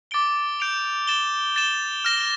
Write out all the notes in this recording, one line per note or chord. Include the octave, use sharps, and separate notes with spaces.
D6 A6 D7 G7
G6 D7 F7
A6 E7 G7
A6 E7 G7
F6 A#6 E7 G7